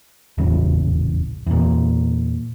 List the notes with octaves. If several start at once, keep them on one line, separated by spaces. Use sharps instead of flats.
D#1 A1 E2 C#3
E2 A#2